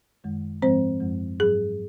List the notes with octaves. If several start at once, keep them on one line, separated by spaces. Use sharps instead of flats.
F#2 D#3 G#3
G#2 F3 G#3 C4 C5
F#2 F3 G#3
G#2 F#3 G#4